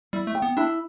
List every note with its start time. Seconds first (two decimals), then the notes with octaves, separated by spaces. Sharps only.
0.13 G3 E4
0.27 A3
0.35 G5
0.42 B3
0.57 D4 E4